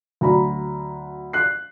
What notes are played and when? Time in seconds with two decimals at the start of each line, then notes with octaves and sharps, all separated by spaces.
0.21 D2 F#3 A#5 B5
1.33 F#6 C7